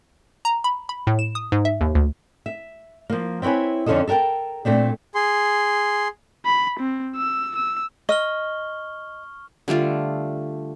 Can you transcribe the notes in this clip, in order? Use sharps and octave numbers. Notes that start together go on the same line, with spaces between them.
A#5
B5
B5
A2
E7
D#6
G#2
E5
D#2
D2
E5
F3 A#3
C4 E4 B4 C#5 G#5
F2 D3 C#4 F4 A4 D#5
A4 A#4 F5 G5 A5
A#2 A3 C4 D4
G#4 C6
B5
C4
E6
E6
D#5 C#6 F6 G7
D3 G3 A3 F4